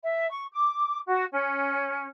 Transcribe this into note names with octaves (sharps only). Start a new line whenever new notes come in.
E5
C#6
D6
F#4
C#4